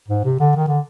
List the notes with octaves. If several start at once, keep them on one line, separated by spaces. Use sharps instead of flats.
G#2
C3
D3
D#3
D3